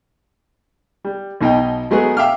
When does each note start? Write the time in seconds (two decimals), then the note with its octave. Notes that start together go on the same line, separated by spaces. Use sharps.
1.04 G3
1.41 B1 B2 D#4 G5
1.91 F#3 G#3 A3 B3 G#4
2.17 E5 F5 G5 D6 F6